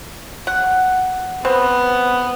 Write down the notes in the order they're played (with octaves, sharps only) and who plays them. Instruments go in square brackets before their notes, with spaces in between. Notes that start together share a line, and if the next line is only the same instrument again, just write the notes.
[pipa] F#5
[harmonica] B3 [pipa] C4